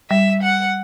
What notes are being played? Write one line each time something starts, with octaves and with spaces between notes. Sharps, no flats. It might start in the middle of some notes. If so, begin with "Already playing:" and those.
G3 E5
F#5